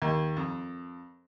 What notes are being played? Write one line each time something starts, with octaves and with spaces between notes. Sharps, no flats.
D#2
F2